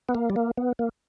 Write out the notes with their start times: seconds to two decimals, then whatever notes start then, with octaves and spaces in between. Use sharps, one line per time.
0.09 B3
0.15 A#3
0.30 G3
0.36 A#3
0.58 B3
0.79 A#3